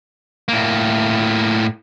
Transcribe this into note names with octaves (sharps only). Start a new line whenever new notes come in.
A2 A#3